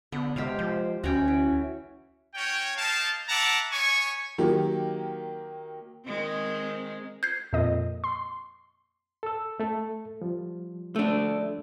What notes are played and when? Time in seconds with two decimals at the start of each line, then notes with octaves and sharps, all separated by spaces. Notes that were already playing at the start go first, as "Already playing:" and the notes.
0.12 D3 B3
0.36 C3 G#3 G4 C5 F5
0.59 F3 C5
1.04 D2 C#4 F#4 C#5 G5
1.28 E3
2.34 C#4 F#4 C#5 G5
2.77 A#3 D#4 F5 A5
3.28 E5 F#5 A5 A#5 D6
3.72 B3 C#5 G#5 C#6
4.38 D#3 F#3 A#3 G4
6.05 D#3 G#3 C4
7.23 G6 G#6 C7
7.53 F2 A#2 D#5
8.04 C6
9.23 A4 E6
9.60 A3 A4
10.22 F3 G3
10.96 A3 D4